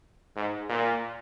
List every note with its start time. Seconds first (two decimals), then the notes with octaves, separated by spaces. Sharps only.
0.36 G#2
0.69 A#2